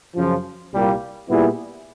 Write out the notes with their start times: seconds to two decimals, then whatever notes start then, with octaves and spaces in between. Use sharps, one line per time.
0.16 F#2 C#3 F3
0.72 C2 A#2 G3 A#3
1.28 A#2 G3 B3 E4 G#4